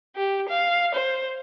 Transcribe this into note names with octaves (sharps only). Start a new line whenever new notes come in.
G4
F5
C5